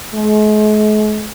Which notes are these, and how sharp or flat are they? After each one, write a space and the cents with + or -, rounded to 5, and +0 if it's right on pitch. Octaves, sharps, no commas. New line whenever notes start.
G#3 +45